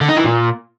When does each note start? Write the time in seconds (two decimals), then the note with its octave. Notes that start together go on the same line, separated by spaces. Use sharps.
0.01 D3
0.09 D#4
0.17 E3
0.25 A#2